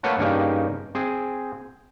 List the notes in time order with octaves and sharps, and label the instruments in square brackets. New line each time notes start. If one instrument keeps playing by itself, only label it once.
[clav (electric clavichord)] A3 A#3 B4 C#5 F#5 A5
G2 C#3 A#3 D#4 G4
C4 G#4